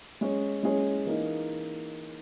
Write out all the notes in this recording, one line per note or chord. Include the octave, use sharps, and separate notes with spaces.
G#3 C#4 G#4 C#5
G#3 C#4 G#4 C#5
E3 A#3 D#4